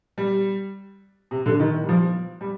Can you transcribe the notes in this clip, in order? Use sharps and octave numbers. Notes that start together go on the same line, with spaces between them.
G3
C3
D3
D#3
G3
F3
G3